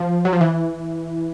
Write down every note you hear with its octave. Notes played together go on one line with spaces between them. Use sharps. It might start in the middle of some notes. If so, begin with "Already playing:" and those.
Already playing: F3
F#3
F3
E3